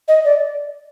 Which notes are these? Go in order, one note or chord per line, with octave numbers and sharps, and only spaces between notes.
D#5
D5